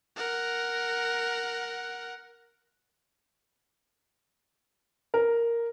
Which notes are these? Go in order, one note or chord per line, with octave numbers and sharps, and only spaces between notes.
A#4 F#5
A#4